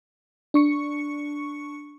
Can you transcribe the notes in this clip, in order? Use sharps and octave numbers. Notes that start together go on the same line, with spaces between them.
D4 C#6 C#7